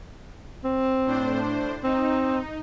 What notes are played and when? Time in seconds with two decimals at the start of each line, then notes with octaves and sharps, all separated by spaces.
0.64 C4
1.05 A2 D4 C5
1.83 C4 D#4